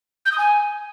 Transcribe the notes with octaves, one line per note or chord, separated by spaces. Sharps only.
G6
D#6
G#5